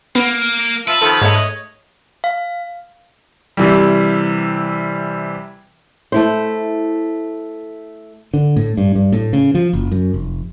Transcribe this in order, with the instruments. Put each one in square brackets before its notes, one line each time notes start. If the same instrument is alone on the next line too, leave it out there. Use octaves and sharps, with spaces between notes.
[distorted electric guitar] A#3 [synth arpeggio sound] B3
[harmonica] F4 E5 A5 [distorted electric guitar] B4
[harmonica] D#3 F3 C4 [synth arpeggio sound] A4 B5
[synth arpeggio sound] G#2 A3 [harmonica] C#5 D#5
[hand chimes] F5
[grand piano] C3 E3 G3
[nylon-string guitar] A3 E4 C5
[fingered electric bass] D3
A2
G2
G2
A2
C#3
F3
F#1
F#2
F1